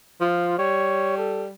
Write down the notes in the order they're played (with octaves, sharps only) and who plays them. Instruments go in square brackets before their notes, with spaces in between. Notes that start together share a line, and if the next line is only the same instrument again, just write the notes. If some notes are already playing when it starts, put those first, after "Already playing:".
[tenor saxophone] F3 [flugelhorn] F4
[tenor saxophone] G3 [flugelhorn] C#5
[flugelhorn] A4